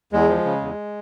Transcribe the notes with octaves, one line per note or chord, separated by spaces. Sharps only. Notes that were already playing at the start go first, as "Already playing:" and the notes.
E2 G#3
F3
C#3
E2